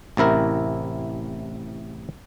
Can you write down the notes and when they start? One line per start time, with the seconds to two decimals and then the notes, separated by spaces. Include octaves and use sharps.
0.17 A1 C3 E4 A#4